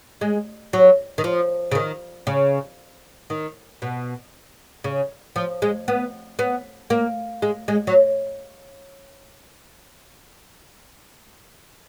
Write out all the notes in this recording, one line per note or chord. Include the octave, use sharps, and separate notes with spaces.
G#3
F#3
D#3
F3
C#3
D#3
C#3
D#3
B2
C#3
F3
G#3
B3
B3
A#3
G#3
G#3
F#3